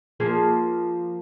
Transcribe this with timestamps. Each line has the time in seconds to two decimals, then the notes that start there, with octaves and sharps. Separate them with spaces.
0.20 F3 A#3 G#4